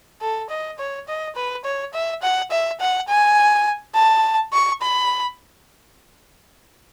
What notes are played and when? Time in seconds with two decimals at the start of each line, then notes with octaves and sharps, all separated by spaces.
0.21 A4
0.50 D#5
0.79 C#5
1.08 D#5
1.35 B4
1.64 C#5
1.94 E5
2.22 F#5
2.51 E5
2.80 F#5
3.09 G#5
3.95 A5
4.53 C#6
4.82 B5